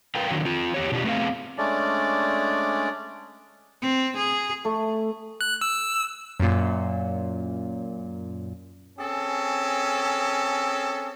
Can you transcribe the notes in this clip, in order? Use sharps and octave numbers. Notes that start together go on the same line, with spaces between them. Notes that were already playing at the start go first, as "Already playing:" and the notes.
A#4 B4 F5 G5
D3 D#3 F#3
C4 F4
E2 G4 C#5
B2 D4 F4 G4
A3 B3 C4 G#4 F5
G#3 A3 C#4 D4 D5
C4
G#4
A3
F#6
E6
F#2 A#2
C4 C#4 G#4 A4